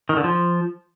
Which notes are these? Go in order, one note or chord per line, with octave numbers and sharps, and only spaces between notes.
D#3
D3
F3